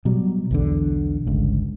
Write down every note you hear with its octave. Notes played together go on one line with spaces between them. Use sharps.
B2 F#3 G3
B1 E2 D3
G1 C#2